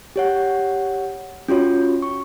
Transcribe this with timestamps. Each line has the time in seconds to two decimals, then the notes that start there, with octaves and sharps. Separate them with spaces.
0.16 G4 C#5 F#5
1.48 C#4 F4 F#4 C#5
2.02 C#6